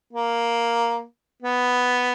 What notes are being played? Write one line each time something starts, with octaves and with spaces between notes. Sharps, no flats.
A#3
B3